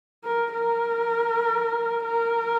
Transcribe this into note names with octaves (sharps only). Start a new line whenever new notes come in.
A#4
A#4
A#4